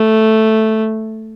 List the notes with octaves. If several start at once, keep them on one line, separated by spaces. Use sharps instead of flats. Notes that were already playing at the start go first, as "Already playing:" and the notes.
Already playing: A3